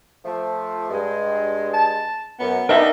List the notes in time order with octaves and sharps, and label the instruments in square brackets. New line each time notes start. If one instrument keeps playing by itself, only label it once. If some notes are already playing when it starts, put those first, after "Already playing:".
[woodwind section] F3 A3
G2 G#3
[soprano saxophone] A5
[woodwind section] F#2 [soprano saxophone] B3
[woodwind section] G3 B3 D4 [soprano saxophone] D#4 [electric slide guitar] A#4 E5